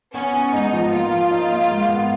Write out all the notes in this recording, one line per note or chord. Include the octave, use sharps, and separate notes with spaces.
B3 C#4
B3
G#2 D#4
F3
A#3 F4
F3
D#4
A#3
G#2
B3